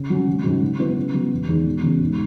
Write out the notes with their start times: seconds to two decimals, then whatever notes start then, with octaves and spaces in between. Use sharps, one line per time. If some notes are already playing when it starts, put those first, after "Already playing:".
Already playing: C#3
0.10 F#3 C#4
0.28 G#1
0.44 G#2 D#3 F#3 C#4
0.62 C#3
0.79 F#3 B3 E4 B4
0.97 C#3
1.14 F#3 B3
1.32 E1
1.48 E2 D#3
1.66 E1
1.83 E2 C#3
2.00 G#2